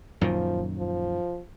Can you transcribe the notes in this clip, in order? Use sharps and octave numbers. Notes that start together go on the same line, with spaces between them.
F#2 A#2 D#3 F3
F3